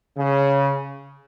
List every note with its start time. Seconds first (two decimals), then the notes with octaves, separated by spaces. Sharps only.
0.17 C#3